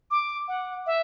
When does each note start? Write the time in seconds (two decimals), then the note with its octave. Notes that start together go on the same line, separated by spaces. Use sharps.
0.11 D6
0.48 F#5
0.86 E5